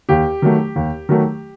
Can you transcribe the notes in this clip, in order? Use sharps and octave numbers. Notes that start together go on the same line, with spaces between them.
D#2 G4
D#3 F#3 A3
D#2
D#3 F#3 A3